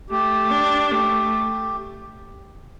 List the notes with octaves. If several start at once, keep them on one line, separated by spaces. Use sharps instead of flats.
A3 G4
D4
A3 G4